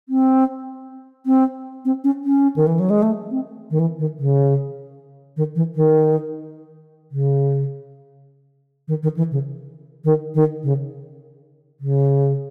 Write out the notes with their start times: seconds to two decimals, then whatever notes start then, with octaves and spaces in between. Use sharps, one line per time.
0.09 C4
1.26 C4
1.85 C4
2.04 C#4
2.24 C#4
2.56 D#3
2.67 E3
2.80 F#3
2.90 G#3
3.02 A3
3.31 C4
3.71 D#3
3.79 E3
3.99 D#3
4.19 C#3
5.37 D#3
5.55 E3
5.75 D#3
7.11 C#3
8.88 D#3
9.03 D#3
9.17 E3
9.31 C#3
10.04 D#3
10.35 D#3
10.63 C#3
11.80 C#3